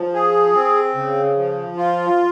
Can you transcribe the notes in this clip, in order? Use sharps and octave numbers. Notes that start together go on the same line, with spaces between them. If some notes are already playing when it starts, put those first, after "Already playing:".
Already playing: F3
G#4
C4
C#3
F3
F4